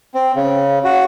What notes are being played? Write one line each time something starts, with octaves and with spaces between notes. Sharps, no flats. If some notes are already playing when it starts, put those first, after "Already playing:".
C4
C#3
F#4